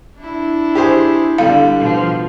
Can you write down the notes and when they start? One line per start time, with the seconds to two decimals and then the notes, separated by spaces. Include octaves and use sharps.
0.17 D4 E4
0.75 G4 G#4 C5
1.38 D3 G3 F5
1.77 B2 F3